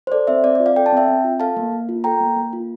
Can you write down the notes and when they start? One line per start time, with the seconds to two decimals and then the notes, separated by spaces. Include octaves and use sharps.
0.07 C5
0.12 A4 D5
0.27 C4 C5 E5
0.44 C4 D5
0.55 D5
0.60 F4
0.66 D5 F5
0.76 A4 G5
0.86 A5
0.93 C4 E5 G5
1.08 C4
1.24 F4
1.40 A4 F5 A5
1.57 A#3
1.72 A#3
1.89 F4
2.04 A4 G5 A#5
2.20 A#3
2.36 A#3
2.53 F4